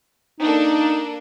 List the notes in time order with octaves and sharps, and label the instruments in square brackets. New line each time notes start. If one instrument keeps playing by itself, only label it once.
[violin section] A#3 D4 A4 [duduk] D#4